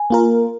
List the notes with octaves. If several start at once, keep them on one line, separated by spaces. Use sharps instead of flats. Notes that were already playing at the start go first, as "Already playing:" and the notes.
Already playing: G#5
A#3 F4 A#4